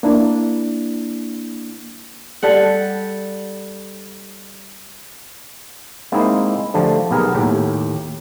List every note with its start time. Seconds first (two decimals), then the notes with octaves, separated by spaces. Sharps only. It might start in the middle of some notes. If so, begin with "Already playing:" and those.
0.03 A#3 D4 E4
2.43 G3 A4 F#5
6.12 G#3 A#3 C4 D#4 E4
6.74 D3 F3 A3 G4
7.11 B1 B3 G4 G#4 A#4
7.35 D#2 A2 G4 G5